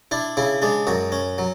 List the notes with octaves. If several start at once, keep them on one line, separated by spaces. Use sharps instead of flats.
D4 E4
C#3 E4
G#3 D4
F#2 F#4
C#4
F#3